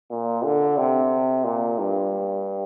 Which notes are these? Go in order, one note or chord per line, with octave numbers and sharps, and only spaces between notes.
A#2
D3
C3
A#2
G2